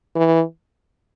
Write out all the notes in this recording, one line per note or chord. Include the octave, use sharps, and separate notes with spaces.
E3